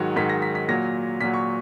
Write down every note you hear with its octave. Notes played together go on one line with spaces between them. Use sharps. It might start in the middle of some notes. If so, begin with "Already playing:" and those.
Already playing: G#2 D#3 F#3
G#2 D#3 F#3 B6
A#6
B6
B6
A#2 F#3 A#6
A#2 F#3 B6
C#6